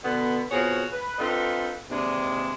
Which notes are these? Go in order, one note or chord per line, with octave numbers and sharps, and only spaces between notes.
B2 D3 B3
F2 B2 F3 F#4 G#4 C#5
B4
C4 D4 D#4 F4 A4 B4
D#2 C3 E3 G#3 D4